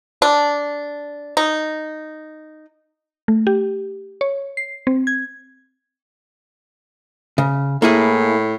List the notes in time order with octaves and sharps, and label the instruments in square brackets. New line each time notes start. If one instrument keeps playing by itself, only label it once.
[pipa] D4
D#4
[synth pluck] A3
G4
C#5
C7
C4
G#6
[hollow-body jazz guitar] C#3
[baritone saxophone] A2 [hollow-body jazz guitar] A#3 E4 G#4